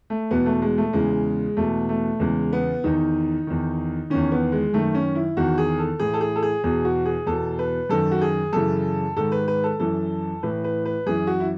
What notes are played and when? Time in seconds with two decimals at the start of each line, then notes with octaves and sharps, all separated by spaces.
0.10 A3
0.31 E2 B2 B3
0.46 A3
0.62 G#3
0.78 A3
0.93 E2 C#3 E3 G#3
1.57 E2 B2 A3
1.89 A3
2.20 E2 C#3 E3 G#3
2.53 B3
2.84 E2 D#3 D#4
3.47 E2 D#3
4.10 E2 D#3 C#4
4.32 B3
4.52 G#3
4.73 F#2 D#3 A3
4.95 C#4
5.15 E4
5.37 E2 D#3 F#4
5.58 G#4
5.79 A4
5.99 A2 E3 G#4
6.14 A4
6.21 G#4
6.36 A4
6.43 G#4
6.64 E2 B2 G#4
6.85 F#4
7.05 G#4
7.26 E2 B2 A4
7.59 B4
7.89 F#2 D#3 A4
8.11 F#4
8.21 G#4
8.53 F#2 C#3 E3 A4
9.17 G#2 D#3 A4
9.32 B4
9.48 B4
9.64 A4
9.80 F#2 E3 A4
10.43 A2 E3 B4
10.64 B4
10.85 B4
11.06 F#2 E3 G#4
11.27 F#4
11.40 E4